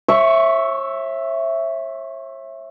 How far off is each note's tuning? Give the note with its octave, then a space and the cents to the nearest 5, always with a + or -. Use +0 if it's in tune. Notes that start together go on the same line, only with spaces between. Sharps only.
C#5 -40 E5 +0 C#6 +10